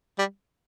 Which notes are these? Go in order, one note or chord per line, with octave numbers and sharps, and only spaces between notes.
G3